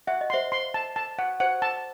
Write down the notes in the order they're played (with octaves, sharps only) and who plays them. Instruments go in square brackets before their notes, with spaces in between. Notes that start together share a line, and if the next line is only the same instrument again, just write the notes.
[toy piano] E5 [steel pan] F#5
[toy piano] D#5
[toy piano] C5 E5 [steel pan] C6
[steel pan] C6
A5
A5
F#5
[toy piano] C5 [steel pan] F#5
[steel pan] A5